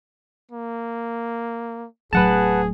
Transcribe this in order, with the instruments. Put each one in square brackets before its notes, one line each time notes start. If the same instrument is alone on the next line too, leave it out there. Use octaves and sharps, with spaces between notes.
[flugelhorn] A#3
[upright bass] D1 F#3 [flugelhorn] G#4 [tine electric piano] B4 F#5 A5